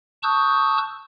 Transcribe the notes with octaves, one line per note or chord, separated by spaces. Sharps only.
A5 C#6 D#6 E6 F#6 G6